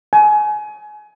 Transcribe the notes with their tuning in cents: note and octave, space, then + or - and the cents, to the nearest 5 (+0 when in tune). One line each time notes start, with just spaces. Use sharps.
G#5 +25